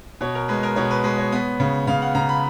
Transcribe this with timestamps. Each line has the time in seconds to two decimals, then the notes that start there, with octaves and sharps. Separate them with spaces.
0.21 B2 C#5
0.35 A#4
0.48 G#3 B4
0.63 A#4
0.76 B2 C#5
0.91 B4
1.04 G#3 B4
1.18 C#5
1.32 B3
1.60 C#3
1.87 C#3 F5
2.02 F#5
2.15 C#3 A#5
2.29 B5